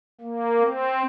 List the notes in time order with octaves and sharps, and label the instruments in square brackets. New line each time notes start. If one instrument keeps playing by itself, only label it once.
[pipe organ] A#3
C4